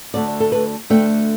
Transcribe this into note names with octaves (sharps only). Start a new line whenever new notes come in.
D2 D3 A3 D5
A4
B4
D2 D3 A3 G5